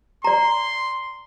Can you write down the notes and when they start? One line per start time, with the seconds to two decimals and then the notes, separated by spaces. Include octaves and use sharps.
0.24 D5 A#5 C6